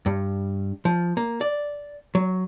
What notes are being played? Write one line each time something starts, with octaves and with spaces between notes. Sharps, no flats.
G2
F3
A#3
D5
F#3